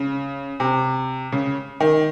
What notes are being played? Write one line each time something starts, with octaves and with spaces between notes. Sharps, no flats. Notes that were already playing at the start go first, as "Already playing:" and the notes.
Already playing: C#3
C3
C#3
D#3